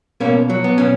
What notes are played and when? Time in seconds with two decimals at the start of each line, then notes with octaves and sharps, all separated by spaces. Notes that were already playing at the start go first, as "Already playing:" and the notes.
0.20 B2 A#3 C#4
0.49 F#3
0.64 B3
0.78 B2 C#4